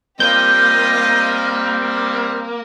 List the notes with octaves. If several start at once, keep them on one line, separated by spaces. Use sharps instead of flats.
G3 A#3 C4 F4 G4 D#5 G6